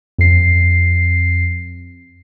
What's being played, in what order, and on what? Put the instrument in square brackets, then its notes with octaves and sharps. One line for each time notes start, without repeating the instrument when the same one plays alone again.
[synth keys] F2 C7